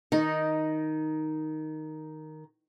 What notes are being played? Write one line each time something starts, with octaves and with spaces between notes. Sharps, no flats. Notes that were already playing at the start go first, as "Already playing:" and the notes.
D#3 D#4